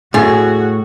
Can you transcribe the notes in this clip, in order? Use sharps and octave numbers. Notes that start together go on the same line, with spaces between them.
A2 F#4 G#4